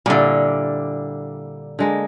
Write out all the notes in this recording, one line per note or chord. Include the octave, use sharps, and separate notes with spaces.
A#2 D3 G3 E4
D3 G#3 A#3